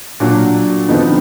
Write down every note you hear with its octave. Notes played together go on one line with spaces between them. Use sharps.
A#2 F#3 D4 F#4
F2 D3 F3 B3 D#4